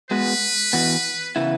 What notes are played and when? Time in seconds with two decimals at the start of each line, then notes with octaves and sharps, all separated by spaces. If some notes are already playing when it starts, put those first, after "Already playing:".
0.10 G#3 B3 F#4 B4
0.73 E3 B3 F#4
1.36 C#3 E3 B3 E4